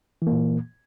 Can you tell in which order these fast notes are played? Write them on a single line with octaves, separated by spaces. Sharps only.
E3 A#3 A#2